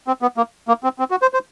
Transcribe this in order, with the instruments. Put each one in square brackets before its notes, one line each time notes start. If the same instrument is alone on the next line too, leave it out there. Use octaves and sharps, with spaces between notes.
[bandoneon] C4
B3
A#3
A#3
C4
C4
F#4
C5
C5